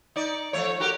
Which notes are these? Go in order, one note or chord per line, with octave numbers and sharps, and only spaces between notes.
D#4 D5
F3 A3 C#5
F#4 G4 A#4